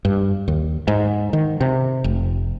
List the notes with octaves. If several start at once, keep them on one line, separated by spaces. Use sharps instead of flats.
G2
D#2
G#2
D#3
C3
F1